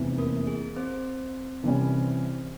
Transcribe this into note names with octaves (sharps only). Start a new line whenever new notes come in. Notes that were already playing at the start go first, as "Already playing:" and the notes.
Already playing: F1 E2 C3 E3
A#3 A#4
G#4
C4 C5
C2 C3 E3 G3 C#4